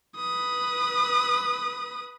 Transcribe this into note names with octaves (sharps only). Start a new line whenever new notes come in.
B4 D#6